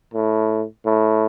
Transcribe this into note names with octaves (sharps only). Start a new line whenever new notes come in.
A2
A2